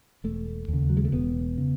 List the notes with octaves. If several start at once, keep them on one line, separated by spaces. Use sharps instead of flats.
E1 A3
D#2 C#3
F#3
G#3
A3
E1 B3
C#3